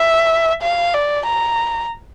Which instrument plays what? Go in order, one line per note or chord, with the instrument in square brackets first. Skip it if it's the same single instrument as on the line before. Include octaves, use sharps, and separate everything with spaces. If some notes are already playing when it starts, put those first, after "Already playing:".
Already playing: [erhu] E5
F5
D5
A#5